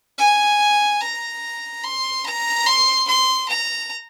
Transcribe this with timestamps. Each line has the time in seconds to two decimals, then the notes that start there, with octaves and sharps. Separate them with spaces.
0.18 G#5
1.01 A#5
1.83 C6
2.25 A#5
2.66 C6
3.08 C6
3.48 A#5